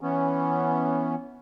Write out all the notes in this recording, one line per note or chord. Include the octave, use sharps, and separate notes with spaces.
E3 B3 C#4